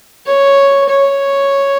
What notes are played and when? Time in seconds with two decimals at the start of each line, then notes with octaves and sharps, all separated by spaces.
0.26 C#5
0.89 C#5